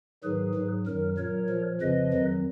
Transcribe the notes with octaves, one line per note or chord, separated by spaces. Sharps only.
G#2 D#3 F#3 G#4 B4
G#2 F#3
F#2 D#3 F#3 A#4
A#2 F#3 A#4 C#5
A#2 F3
F2 C#3 F3 B4 D#5
F2 D#3 F#3